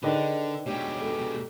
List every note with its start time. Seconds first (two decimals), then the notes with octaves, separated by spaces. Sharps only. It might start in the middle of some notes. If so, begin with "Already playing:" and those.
0.03 D3 D#3 D4 G#4 B4 D#5
0.66 B2 G#3 G4 C#5
1.01 A4